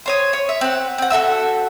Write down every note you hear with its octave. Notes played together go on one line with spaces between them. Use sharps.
C5 C#5 D#6
C#5
E5
C4 F#5
C4 F#5
F#4 A4 E5 E6